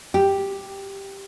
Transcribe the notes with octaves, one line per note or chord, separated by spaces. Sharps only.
G4